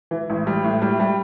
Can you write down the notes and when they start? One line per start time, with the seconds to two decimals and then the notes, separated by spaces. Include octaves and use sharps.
0.11 E3
0.30 A1
0.47 G3
0.64 A2
0.82 G3
1.00 G3